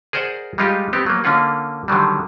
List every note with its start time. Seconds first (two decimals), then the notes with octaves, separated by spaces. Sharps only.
0.13 G#4 A#4 C5 D5 F#5
0.58 G3 G#3 D#4 F4 G4
0.93 B3 C4 G4
1.06 F#3 A#3
1.24 D3 A#3 C#4 F4 F#5
1.88 D3 D#3 F#3 G3